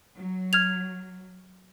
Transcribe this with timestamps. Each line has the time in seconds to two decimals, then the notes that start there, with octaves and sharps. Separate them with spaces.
0.17 F#3
0.53 F6 G#6 F7